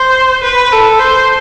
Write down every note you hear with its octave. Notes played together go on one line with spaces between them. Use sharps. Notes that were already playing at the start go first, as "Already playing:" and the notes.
Already playing: C5
B4
A4
C5